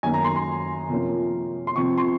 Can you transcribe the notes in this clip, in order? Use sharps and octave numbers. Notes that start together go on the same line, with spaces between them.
F#2 D#3 A#3 C#4 G#5
A#5
C6
C6
C3 F3 A#3 C#4
C6
C3 F3 C4 C#6
C6